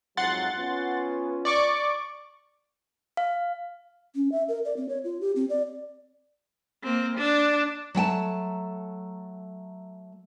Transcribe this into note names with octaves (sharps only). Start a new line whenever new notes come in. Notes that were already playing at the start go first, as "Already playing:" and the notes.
F2 G#2 F#3 F#5 C6 A6
B3 C#4 F4
D5 C#6 D6
F5
C#4
E5
A#4
D5
C4
C#5
F4
G4
C4
D5
A#3 C4
D4
F#3 A3 G5 A5